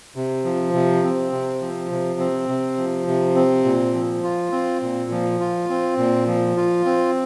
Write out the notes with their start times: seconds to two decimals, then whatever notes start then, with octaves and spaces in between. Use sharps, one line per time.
0.15 C3
0.44 F3
0.74 C3
1.04 C4
1.32 C3
1.61 F3
1.90 C3
2.20 C4
2.49 C3
2.77 F3
3.07 C3
3.36 C4
3.65 A#2
3.94 F3
4.24 F4
4.52 C4
4.82 A#2
5.11 F3
5.40 F4
5.70 C4
5.98 A#2
6.27 F3
6.57 F4
6.86 C4